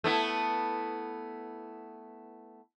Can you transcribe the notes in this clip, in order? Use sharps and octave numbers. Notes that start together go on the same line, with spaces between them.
A3 B3 E4